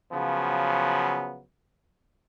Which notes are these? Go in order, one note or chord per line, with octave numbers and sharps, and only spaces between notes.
C#3 F3 F#3 B3